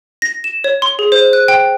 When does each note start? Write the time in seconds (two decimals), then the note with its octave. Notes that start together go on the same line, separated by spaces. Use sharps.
0.22 A#6
0.44 E7
0.64 C#5
0.82 C6
0.99 G#4
1.12 C5
1.33 F#6
1.48 G5